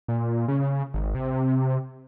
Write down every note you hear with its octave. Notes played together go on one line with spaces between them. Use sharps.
A#2
C#3
G#1
C3